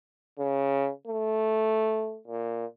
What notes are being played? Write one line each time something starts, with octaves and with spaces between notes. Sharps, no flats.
C#3
A3
A#2